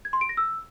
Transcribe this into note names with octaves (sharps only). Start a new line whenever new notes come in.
G#6
C6
D7
A#6
E6